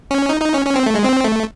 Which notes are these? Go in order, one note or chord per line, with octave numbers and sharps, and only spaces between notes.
C#4
D#4
D#4
C#4
C#4
C4
A3
G#3
C4
A3